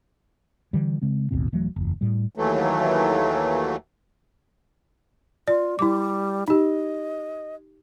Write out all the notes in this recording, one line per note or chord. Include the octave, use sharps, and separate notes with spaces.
D3 E3 G3
C#3 G#3 C4
A1 D#2 B2 C4
D#1 E3 F#3 A3
F#1 E2
A2 G3
D#2 E3 F#3 A3
F4 D5
G3 E4 D6
D#4 G4 D#5